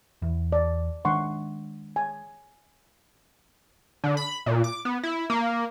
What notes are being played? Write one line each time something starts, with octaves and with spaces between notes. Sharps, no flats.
E2
D5
D#3 G#3 D4 F#5 C6 C#6
G#5
D3
B5
A#2
D6
B3
E4
A#3